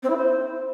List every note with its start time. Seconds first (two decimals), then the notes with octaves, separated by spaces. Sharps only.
0.03 C4
0.10 E4
0.16 C5